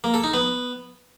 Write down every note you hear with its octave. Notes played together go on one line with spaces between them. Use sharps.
A#3
A4
D#4
B3